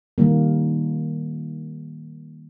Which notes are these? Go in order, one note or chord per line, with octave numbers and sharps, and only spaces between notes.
D#3 G3 A#3